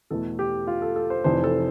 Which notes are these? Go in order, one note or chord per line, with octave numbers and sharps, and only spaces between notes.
E2 B2 A3 A4
G4
F4
A4
A4
C5
F1 F2 C3 E3 C5
A4